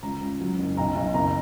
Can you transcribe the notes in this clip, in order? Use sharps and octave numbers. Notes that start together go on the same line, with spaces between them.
C#2 A#5
C#2
F#3
F#1
B1 A#5
B1
F#1 A#5